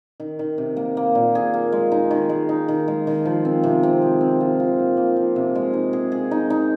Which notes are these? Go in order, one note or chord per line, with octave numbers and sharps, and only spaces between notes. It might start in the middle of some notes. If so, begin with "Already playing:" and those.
D#3
D#3
C3
A#3
A#3
A#2
G#4
A#3
G#3
D#4
D#3
G#3
D#4
D#3
G#3
D#3
F3
C4
C3
C4
G#4
C4
F4
F4
A#3
A#3
F3
C3
G#3
D#4
G#4
G#4
D#4
D#4